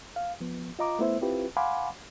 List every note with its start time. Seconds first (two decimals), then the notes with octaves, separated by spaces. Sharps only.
0.16 F5
0.41 F3 B3
0.79 F4 D#5 A#5 D6
0.99 A3 B3 E4 C5 E5
1.21 C4 E4 F4 G4 B4
1.57 F5 F#5 G#5 B5 C6 D6